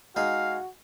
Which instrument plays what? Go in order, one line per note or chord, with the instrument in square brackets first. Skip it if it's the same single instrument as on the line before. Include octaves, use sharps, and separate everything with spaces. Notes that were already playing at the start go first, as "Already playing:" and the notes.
[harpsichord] G#3 D#4 G#4 [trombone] F#4 [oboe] F5